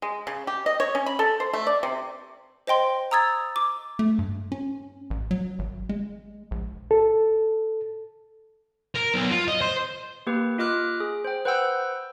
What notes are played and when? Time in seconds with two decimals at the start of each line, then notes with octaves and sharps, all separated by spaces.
0.02 G#3
0.27 C#3
0.47 G4
0.66 D#5
0.80 C#5
0.95 C#4
1.06 B5
1.19 A4
1.40 C5
1.53 A3
1.67 D5
1.83 C3
2.67 C5 D#5 G5 C6
3.11 A#5 D#6 E6 G#6 A6
3.56 D6
3.99 A3
4.19 G2
4.52 C#4
5.10 A1
5.31 F#3
5.59 G#1
5.89 G#3
6.51 A#1
6.91 A4
8.95 A#4
9.14 B1
9.31 F4
9.48 D#5
9.61 C5
10.27 A#3 G4 B4
10.58 F4 D#5 D6 F6 F#6
11.00 G#4
11.25 C5 G5
11.45 B4 C5 F#5 G5 E6 G6